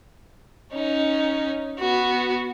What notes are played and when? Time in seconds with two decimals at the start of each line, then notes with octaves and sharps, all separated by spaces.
0.73 C#4 D#4
1.79 B3 F#4